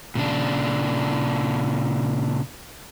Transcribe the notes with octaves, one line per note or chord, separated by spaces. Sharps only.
A#2 C#3 D4